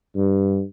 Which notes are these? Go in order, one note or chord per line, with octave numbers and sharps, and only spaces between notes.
G2